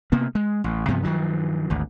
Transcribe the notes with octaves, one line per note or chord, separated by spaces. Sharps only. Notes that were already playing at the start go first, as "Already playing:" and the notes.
C3 A#3 B3
G#3
A1
G2 C3 F3 B3
G2 D#3 F3 F#3
G#1 D2